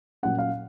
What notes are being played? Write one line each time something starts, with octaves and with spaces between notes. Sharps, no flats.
A#2 F#3 C#4 F#5
F5